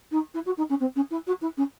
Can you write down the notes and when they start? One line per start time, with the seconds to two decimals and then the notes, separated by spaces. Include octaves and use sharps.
0.11 D#4
0.34 E4
0.45 F#4
0.57 D#4
0.69 C#4
0.80 C4
0.95 C#4
1.10 E4
1.26 F#4
1.41 E4
1.57 C#4